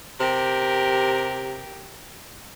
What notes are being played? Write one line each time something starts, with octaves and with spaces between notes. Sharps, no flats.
C3 G4 A#4